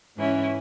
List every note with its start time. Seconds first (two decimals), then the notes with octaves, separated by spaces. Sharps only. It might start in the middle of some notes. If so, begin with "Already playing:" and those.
0.17 G#2 E3 C#4 E4